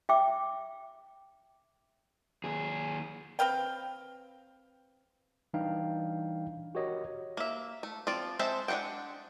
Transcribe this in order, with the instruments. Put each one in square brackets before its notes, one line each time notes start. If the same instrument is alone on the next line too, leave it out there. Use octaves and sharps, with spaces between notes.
[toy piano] E5 G5 D6
[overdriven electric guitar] D#2 G#4
[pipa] C4 B4 F5 G5
[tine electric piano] E3 G3 D4 D#4 F5 G5
F#4 G4 A#4 C#5 D#5
[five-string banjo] A#3 E5
A3
F3 C4 D5
G#3 C4 A4 C5 E5
G#3 D4 C5 F#5 G5